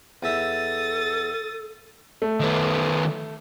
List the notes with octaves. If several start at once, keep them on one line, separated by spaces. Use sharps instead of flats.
E2 A4 E5 D#6 A6
A3
D#3 B3